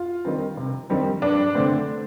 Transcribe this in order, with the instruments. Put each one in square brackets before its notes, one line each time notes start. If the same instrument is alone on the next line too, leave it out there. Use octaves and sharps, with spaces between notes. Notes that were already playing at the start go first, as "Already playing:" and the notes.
Already playing: [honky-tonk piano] F4
D#3 G3 C4
C3
D#3 G3 C4
G2 D4
D3 A3 C4